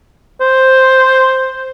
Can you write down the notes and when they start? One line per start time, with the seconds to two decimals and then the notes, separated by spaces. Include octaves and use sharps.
0.41 C5